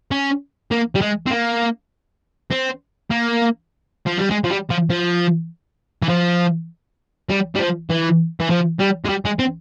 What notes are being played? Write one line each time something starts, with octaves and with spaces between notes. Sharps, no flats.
C#4
A#3
G3
G#3
C4
A#3
C4
A#3
F3
G3
G#3
F3
G3
F3
F3
E3
F3
G3
G3
F3
E3
E3
F3
G3
G#3
G3
G#3
C4